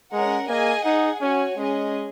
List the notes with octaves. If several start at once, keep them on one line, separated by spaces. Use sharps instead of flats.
G#3 C#4 A#4 F#5
A#3 G#4 D#5 G#5
D#4 G#4 F#5
C#4 F#4 C#5 G#5
G#3 C#4 G#4 D#5